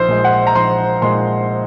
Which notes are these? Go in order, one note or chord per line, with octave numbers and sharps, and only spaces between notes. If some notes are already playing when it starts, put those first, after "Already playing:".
Already playing: A#1 C5
A#2 G#3
F#5
A#5
A#1 C6
A#2 G#3 C6